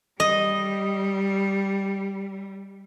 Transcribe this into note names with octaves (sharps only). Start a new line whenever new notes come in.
G3 D#5